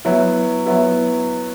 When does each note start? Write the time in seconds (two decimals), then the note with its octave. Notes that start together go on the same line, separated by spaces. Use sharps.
0.05 F#3 B3 E4
0.66 F#3 B3 E4